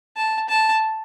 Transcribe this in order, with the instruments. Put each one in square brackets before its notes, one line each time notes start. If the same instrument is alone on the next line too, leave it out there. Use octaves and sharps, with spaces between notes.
[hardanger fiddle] A5
A5